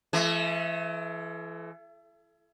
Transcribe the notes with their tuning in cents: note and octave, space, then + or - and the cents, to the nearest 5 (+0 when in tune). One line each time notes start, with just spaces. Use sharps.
E3 +35 A3 -30